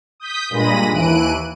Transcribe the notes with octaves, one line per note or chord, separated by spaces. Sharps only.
D#6 G6 B6
G2 A#2 G#3 B5 A#6 D#7
D#2 E3 F#6 D7 D#7